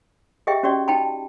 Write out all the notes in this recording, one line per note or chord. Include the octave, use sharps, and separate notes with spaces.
G4 G#4 D#5 E5 G5
C#4 F#4 G4 D5 D#5
D#4 G5 A5 B5